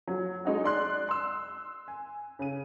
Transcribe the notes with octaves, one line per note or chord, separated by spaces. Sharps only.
F#3
G#3 D#4 F#4
D5 C6 F#6
C6 E6
G#5
C#3 D#7